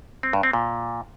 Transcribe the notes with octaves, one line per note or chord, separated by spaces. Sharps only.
C4
G2
C4
A#2